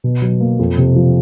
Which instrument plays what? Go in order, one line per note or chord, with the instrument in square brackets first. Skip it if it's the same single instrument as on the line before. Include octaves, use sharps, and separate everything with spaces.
[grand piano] B2
F#3
A#3
F2
C3
F3